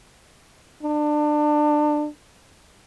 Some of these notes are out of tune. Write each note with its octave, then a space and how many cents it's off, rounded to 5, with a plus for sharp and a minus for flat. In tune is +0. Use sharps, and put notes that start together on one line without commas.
D4 +25